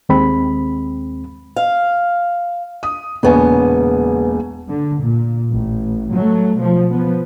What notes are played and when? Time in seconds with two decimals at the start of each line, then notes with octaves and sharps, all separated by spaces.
0.09 D#2 G#3 C4 B5
1.56 F5
2.83 D#6
3.23 E1 A#2 C#3 B3 G#5
4.69 D3
5.02 A#2
5.52 A1
6.12 F#3 A3
6.56 B2 F3
6.91 F3 B3